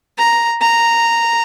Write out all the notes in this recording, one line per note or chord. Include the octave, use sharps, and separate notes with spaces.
A#5
A#5